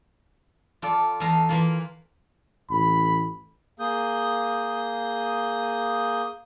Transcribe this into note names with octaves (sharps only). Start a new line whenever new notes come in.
F4 A4 D5
E2 A4 F5 A#5
E3 A#3 F4
A1 B5
A#3 G#4 D#6 G6